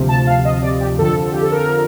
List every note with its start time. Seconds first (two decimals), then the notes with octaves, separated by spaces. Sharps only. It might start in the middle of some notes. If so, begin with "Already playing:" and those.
Already playing: D2 C3 F3
0.09 A5
0.27 F5
0.45 D#5
0.63 D5
0.80 G4
0.98 F2 D3 F3 A4
1.32 G4
1.42 A4
1.52 A#4